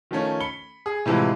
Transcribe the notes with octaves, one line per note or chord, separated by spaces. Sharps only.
D#3 F3 A3 C#4
B5 C#7 G7
G#4
A2 C3 E3 F3 G#3